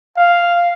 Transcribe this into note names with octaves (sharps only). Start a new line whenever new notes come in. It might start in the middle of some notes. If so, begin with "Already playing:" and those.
F5